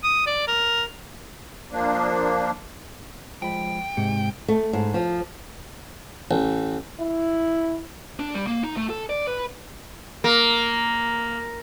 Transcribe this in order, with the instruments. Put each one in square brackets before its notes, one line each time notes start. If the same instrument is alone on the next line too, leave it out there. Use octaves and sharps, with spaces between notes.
[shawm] D#6
D5
A#4
[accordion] F3 A#3 D4
[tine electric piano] F3 G#3 B5 [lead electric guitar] G5
[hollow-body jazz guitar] G#2 [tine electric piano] C3 G#3 C#7
[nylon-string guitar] A3
G#2
F3
[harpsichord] A1
[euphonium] E4
[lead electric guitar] D4
G3
A#3
D#4
A3
A4
D5
B4
[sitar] A#3